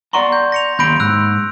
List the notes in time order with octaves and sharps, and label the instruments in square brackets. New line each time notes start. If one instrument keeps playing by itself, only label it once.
[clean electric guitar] D5 F#5 A#5 [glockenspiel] C6 C#6
[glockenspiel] G6
A#6 C#7 F7
[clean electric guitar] D#2 B5 C6 [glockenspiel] G6 A#6 D7
[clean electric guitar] G#2 [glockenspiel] E6 F#6